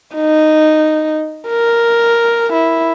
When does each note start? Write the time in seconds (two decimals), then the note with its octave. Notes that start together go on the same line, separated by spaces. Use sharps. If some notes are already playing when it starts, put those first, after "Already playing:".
0.16 D#4
1.48 A#4
2.53 E4